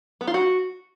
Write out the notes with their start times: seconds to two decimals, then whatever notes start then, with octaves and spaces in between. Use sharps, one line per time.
0.21 B3
0.27 F4
0.34 F#4